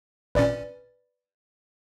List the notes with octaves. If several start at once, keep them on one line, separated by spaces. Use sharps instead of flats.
G#1 A#2 C#4 B4 D5 A6